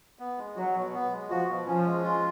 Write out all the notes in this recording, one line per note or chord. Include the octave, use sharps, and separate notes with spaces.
B3
G#3
F#3 F#4
B2
B3
G#3
F3 F#4
B2
F3 C#4
G#3
F4